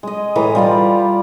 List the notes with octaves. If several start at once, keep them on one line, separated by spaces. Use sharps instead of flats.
G#3 D#5
A2 E3 G#3 A#5
G3 F4 D5